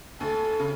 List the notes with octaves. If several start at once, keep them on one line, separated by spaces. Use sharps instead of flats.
D2 A4
C#3